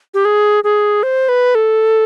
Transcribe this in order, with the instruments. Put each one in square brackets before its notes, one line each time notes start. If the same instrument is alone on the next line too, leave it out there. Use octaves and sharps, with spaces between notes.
[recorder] G4
G#4
G#4
C5
B4
A4